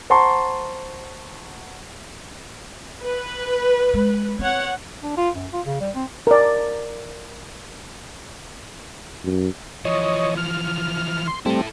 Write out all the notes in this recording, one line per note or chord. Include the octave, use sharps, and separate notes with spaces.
C5 F#5 A5 A#5 C6 C#6
B4
G#3
C4 C#5 F#5
D4
F4
F#2
F4
C#3
G3
C4
A#4 D5
F#2
E3 F3 C#5 D#5
F6
C6
G3 A3 C4 E4 A4